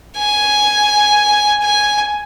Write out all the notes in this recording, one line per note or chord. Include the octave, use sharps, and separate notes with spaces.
G#5
G#5